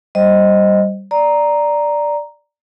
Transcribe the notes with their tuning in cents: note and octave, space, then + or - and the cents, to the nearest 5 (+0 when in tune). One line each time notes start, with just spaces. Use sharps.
G3 -15 C5 +0 D#5 +0
D5 +0 A#5 +0